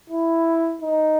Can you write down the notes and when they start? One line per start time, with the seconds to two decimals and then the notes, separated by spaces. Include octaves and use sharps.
0.10 E4
0.81 D#4